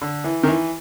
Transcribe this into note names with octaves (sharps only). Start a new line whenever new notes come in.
D3
E3
D#3
E3